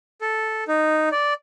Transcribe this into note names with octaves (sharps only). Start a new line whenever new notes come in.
A4
D#4
D5